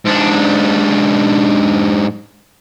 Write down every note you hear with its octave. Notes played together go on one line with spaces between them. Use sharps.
G#2 D4